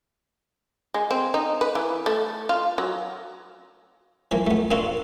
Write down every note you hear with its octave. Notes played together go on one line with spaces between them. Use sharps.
G#3
C4
D#4
B4
E3
A3
F4
F#3
E3 F3 A#3
A3 B3
A#3 B3 D4 F4 F#4 A4